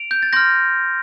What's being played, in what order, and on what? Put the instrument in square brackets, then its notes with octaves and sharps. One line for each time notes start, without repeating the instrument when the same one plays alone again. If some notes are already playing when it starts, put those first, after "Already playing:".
Already playing: [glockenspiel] D7 F7
G6
A6
C6 F6 G6 A#6